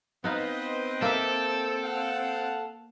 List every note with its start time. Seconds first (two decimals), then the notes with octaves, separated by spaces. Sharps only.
0.24 B3 C4 D#4 B4 C5 D#5 F5
1.02 A#3 A4 E5
1.83 F5 F#5